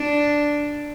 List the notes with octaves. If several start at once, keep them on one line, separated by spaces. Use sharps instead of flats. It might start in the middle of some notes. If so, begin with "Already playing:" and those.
Already playing: D4